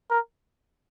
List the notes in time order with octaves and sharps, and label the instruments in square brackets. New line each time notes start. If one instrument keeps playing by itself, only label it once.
[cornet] A#4